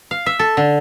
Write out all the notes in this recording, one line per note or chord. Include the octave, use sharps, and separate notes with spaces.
F5
E5
A4
D3